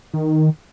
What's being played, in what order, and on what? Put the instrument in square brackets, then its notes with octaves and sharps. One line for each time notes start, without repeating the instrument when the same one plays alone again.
[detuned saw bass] D#3